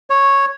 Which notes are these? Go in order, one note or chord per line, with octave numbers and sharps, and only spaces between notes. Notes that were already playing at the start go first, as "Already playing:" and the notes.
C#5